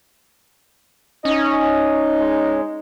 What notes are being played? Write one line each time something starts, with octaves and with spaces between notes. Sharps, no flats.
C#4 D#4 D#5
G#3